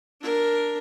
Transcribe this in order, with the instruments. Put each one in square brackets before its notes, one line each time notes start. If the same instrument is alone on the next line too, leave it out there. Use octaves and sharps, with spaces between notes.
[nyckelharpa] D4 A#4